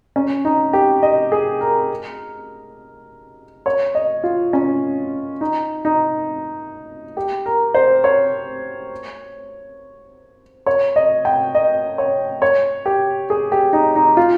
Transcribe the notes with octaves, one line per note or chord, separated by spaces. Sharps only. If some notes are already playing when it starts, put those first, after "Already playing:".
C#4
D#4
G4
D#5
G#4
A#4
C#5
D#5
F4
C#4
D#4
D#4
G4
A#4
C5
C#5
C#5
D#5
G5
D#5
C#5
C#5
G4
G#4
G4
D#4
D#4
F4